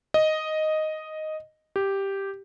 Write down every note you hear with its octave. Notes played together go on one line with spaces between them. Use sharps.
D#5
G4